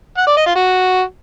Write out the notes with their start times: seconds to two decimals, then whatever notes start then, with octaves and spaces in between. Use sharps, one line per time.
0.17 F#5
0.27 D5
0.36 D#5
0.46 F4
0.56 F#4